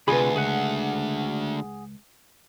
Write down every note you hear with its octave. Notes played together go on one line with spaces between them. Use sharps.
D2 C3 F4 G#4 B4 B5
C#2 G#4 F#5